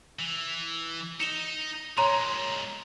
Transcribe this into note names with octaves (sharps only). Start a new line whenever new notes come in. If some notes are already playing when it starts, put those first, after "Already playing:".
E3
D#4 C#7 E7 G7
A#2 G#3 C#5 A#5 C6